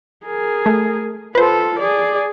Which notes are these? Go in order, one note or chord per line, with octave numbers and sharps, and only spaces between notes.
G#4 A#4
A3
F4 A4 B4 C5
G#4 D5